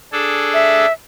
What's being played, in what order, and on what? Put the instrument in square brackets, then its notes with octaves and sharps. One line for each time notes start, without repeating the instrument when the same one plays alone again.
[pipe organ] D4 G#4 A4
[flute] E5